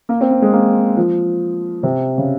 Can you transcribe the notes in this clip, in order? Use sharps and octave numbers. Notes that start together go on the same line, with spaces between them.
A#3
C4
A#3
G#3
A#3
F3
C3
C#3